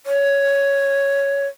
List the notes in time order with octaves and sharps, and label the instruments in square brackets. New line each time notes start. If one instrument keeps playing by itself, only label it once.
[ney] C#5